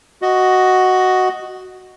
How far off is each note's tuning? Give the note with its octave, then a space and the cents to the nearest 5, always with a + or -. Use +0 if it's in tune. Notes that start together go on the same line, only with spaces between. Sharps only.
F#4 +5 D#5 +0